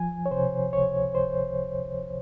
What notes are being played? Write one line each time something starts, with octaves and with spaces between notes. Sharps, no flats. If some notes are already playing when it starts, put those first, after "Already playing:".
Already playing: F3 G#5
C#5
C3 C5
C#2 C#5
C5